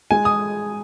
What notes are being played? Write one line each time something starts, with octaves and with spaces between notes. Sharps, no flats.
G#3 G#5
D#6